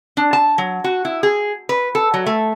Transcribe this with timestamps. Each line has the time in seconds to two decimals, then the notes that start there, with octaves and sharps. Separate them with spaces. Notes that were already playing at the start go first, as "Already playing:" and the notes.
0.17 D4
0.33 A5
0.58 F#3
0.84 F#4
1.05 E4
1.23 G#4
1.69 B4
1.95 A4
2.14 F#3
2.26 A3